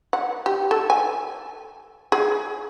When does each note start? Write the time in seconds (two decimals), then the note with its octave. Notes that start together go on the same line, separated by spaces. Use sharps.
0.13 F#5
0.46 G4
0.71 A4
0.90 G#5
2.12 G#4